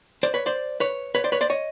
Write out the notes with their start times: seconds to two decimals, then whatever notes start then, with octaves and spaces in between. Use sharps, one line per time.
0.23 C5 D5
0.34 B4 C#5
0.46 C5 D5
0.80 B4 C#5
1.15 B4 C#5
1.24 C5 D5
1.32 B4 C#5
1.41 C5 D5
1.50 C#5 D#5